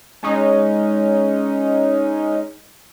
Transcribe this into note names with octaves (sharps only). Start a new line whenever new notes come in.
G#3 C#4 D#4